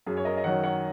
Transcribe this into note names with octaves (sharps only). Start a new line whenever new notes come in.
F#2 G#4
C#5
A#4 D#5
D#5
D#3 F#3 C#5 F#5
C#5 F#5